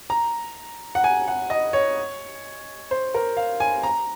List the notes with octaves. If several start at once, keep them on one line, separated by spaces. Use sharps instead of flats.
A#5
F#5
G#5
F#5
D#5
C#5
C5
A#4
F5
G#5
A#5